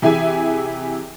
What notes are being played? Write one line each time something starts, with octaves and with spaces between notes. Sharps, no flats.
C3 E3 E4 G#4 E5 G#5